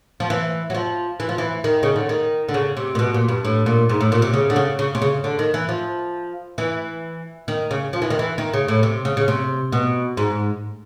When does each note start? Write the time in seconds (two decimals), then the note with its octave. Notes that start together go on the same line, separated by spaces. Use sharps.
0.20 F3
0.30 E3
0.70 F#3
0.75 F3
1.20 E3
1.29 F3
1.38 E3
1.64 D#3
1.83 C#3
1.96 D3
2.09 D#3
2.48 D3
2.54 C#3
2.77 C3
2.95 A#2
2.99 B2
3.14 A#2
3.28 G2
3.45 A2
3.66 A#2
3.89 G#2
4.01 A2
4.12 A#2
4.22 C3
4.33 C#3
4.50 D3
4.56 C#3
4.79 C#3
4.95 C3
5.02 C#3
5.24 D3
5.39 D#3
5.54 E3
5.69 F3
6.58 E3
7.48 D#3
7.71 C#3
7.93 F3
8.02 E3
8.10 D#3
8.19 E3
8.38 D#3
8.54 C#3
8.68 A2
8.83 C3
9.05 C#3
9.17 C#3
9.28 C3
9.72 B2
10.17 G#2